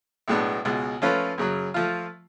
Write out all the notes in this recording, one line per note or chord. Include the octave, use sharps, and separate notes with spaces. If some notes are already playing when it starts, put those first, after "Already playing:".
B1 A2 G#3 B3 D4
C#2 B2 G#3
F3 A3 C#4 F4 B4
F#2 C#3 F#3
F3 A3 F4